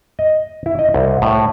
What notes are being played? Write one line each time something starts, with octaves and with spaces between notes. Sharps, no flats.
D#5
E4
D#5
C2
A2